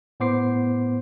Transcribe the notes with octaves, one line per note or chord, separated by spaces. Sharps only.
A2 B3 C5 D6 C7